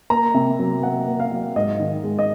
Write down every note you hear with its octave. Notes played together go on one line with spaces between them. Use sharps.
A#3 A#5
C3
F#3
A#3 F#5
A#3
F5
F#3
G#2 D#5
D#3
G#3
D#5